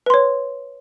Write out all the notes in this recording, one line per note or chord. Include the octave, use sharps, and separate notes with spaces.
B4 C#5 C6